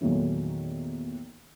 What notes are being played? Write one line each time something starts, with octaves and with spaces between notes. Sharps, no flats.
E2 A#2 D#3 F#3 A3